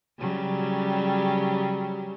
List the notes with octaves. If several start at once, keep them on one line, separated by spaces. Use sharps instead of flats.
C#3 F#3 G3